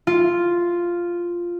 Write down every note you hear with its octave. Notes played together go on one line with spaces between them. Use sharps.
F4